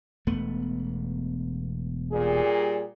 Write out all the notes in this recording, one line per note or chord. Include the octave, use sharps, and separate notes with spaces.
E1 A3 B3
A#2 G3 G#4